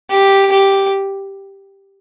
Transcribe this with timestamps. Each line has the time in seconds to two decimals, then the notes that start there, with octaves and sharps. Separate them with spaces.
0.11 G4
0.52 G4